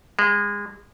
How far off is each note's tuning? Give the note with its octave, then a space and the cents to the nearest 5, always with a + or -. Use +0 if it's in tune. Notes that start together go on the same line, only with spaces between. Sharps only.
G#3 -30